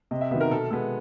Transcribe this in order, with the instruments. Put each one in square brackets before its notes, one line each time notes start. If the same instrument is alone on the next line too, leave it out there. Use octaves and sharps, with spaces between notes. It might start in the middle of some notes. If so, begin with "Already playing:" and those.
[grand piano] C3 D#5
E5
D#3 F#3 B3 E5
A#4
B2 A4
G#3 B3 A4